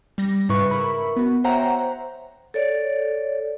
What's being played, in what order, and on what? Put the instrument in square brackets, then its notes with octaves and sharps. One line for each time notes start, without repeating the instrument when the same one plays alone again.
[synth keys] G3 A#6
G#2 C#3 E4 B4 C#6
E4 A#4 B5 C#6
B3 F#4
C5 C#5 E5 F#5 G5 A#5
[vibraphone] A4 C#5 D5